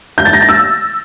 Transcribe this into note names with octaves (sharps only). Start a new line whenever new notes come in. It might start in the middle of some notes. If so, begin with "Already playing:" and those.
G6
A6
A#6
A6
E6